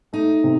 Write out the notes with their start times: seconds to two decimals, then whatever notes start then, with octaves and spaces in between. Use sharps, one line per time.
0.13 A3 D#4
0.44 C3